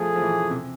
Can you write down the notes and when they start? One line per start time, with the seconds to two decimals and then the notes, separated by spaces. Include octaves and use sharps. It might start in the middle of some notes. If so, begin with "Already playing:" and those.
Already playing: F3 A3 G#4
0.16 F3
0.22 E3
0.50 C3